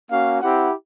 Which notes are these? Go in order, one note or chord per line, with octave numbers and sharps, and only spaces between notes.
A#3 C#4 F#4 F5
C4 E4 G4 F#5